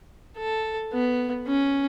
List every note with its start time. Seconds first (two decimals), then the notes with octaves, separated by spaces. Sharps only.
0.38 A4
0.92 B3
1.47 C#4